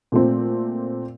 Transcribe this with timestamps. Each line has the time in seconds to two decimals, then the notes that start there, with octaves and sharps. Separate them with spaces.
0.12 A#2 A3 C4